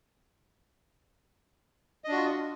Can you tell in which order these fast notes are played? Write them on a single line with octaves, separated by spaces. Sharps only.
D#5 D4 F#4 F4